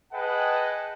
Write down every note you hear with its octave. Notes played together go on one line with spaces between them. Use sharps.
G#4 B4 D#5 F#5 G5 A5